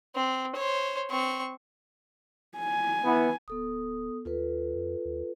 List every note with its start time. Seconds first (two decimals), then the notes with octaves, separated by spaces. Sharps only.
0.15 C4
0.55 C5 C#5
1.10 C4 C#6
2.58 G#5
3.04 E3 B3
3.48 D1 B3 A4 D#6
4.25 D#2 F4 A4 B4
4.75 F2
5.05 D#2